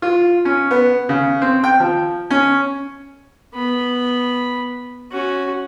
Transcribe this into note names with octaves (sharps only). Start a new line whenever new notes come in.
F4
C#4
B3
C#3
C4
G5
F3
C#4
B3 B5
C#4 F#4